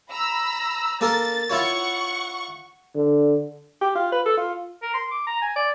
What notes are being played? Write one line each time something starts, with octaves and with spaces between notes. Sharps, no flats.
A#5 B5 E6
A#3 A4 A#4 A6
E4 F4 C#5 F#5 C#6
D3
G4
F4
B4
A4
F4
A#4
C6
D6
A#5
G#5
D5